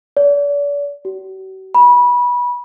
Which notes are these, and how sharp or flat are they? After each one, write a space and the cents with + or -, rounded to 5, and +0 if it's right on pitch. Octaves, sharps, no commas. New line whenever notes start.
D5 -40
F#4 +45
B5 -20